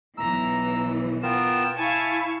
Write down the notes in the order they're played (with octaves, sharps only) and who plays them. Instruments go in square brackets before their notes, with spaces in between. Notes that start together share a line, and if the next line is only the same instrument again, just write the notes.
[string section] B1 E3 [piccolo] A#5 [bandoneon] E6
[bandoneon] B3 F4 A#4 [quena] G5 [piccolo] E7
[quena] E4 [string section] F5 C#6 [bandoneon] G#5 A5